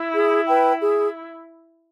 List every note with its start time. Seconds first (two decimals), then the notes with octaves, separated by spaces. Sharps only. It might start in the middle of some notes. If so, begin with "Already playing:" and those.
Already playing: E4
0.14 G#4
0.47 B4 G5
0.81 G#4